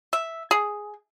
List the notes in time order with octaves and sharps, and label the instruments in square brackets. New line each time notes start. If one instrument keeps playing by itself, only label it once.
[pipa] E5
G#4